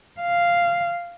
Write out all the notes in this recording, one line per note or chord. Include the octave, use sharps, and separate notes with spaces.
F5